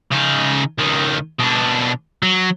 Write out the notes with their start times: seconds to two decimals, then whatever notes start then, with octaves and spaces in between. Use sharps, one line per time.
0.11 C#3 D#4
0.78 C#2 D#3
1.40 B2 D4
2.23 F#3